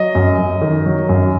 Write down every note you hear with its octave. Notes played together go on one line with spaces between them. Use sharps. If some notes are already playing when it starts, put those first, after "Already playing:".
Already playing: F#3 D#5
F#2
F#2
D#3
F#3
F#2